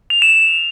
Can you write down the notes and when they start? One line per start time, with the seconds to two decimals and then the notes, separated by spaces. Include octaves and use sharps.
0.10 F7
0.22 E7